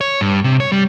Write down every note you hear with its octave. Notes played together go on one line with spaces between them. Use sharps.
C#5
G2
C3
C#5
G3